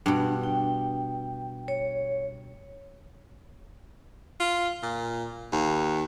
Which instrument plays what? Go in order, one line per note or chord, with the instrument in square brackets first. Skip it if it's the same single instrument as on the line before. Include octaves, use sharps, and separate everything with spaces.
[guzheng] G2 B2 [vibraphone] D4
[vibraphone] G5
C#5
[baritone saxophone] F4
A#2
D#2